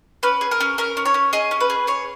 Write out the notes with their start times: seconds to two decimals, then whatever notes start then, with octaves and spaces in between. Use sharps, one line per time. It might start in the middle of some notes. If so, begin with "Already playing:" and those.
0.23 C#4 B4
0.41 G#4
0.51 A#4
0.60 C#4
0.78 C#4 A#4
0.97 C#4
1.06 C#5
1.14 C#4
1.33 G#4 D#5
1.51 C#4
1.60 B4
1.70 G#4
1.87 G#4 C#5